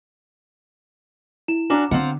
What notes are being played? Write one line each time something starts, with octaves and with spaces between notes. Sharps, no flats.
E4 E7
C#4 D4 F#4 A#5 D6 E7
D3 C4 F4 F#5